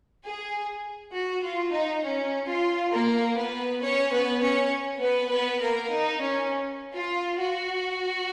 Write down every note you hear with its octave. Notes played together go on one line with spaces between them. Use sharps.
G#4
F#4
F4
D#4
C#4
F4
A#3 A#4
B3 B4
C#4 C#5
B3 B4
C#4 C#5
B3 B4
B3 B4
A#3 A#4
D#4
C#4
F4
F#4